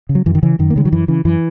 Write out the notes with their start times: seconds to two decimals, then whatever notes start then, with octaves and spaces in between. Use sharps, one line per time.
0.09 C#3
0.15 F#3
0.26 F#2 E3
0.35 D#3
0.43 C#3 E3
0.59 F#2 D#3
0.70 A#3
0.76 C#3 G#3
0.85 F#3
0.92 F#2 E3
1.08 C#3 E3
1.25 F#2 E3